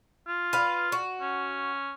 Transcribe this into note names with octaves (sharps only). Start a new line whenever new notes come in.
F4
B4 F5
F#4
C#4